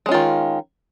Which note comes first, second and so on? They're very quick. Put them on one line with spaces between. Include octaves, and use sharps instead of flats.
G#3 C#4 F4 D#3